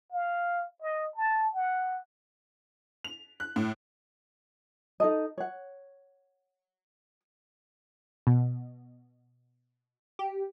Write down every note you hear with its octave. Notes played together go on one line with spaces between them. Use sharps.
F5
D#5
A5
F#5
F7
F#6
A2
D#4 A4 D#5
C#5 F#5
B2
G4